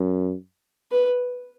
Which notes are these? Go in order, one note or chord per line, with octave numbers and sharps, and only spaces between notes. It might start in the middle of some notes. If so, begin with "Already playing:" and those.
Already playing: F#2
B4